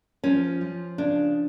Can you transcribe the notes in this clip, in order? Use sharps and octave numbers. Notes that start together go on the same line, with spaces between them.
F3 C#4
F3
C#3 D4